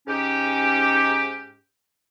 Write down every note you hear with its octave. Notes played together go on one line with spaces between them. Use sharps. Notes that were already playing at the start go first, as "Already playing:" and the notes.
G#2 C#4 G4